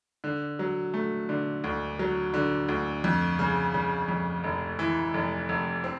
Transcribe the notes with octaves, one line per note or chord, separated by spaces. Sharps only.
D3
F#3
A3
D3
D2
F#3
D3
D2
F2
C#3
C#3
F2
F1
E3
F1
F1
C4